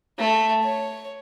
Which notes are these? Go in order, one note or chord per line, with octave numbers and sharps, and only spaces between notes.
A3
C#5